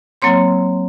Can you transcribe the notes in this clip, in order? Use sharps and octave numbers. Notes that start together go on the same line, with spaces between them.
F#3 A#3 C4 C#5 C6